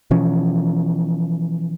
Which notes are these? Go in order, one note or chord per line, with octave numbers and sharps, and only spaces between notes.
B2 E3 F3 C#4